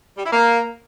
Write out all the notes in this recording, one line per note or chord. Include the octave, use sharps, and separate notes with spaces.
G3
E4
A#3